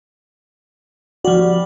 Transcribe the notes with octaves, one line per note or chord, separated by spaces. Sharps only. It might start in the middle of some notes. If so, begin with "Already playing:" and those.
F3 G3 F#4